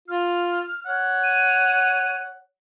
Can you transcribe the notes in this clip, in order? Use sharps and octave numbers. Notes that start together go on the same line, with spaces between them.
F4 F6
C#5 F#5
D#7